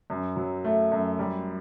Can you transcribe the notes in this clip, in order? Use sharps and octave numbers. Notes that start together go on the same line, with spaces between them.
F#2
F#3
A3
F#2
G3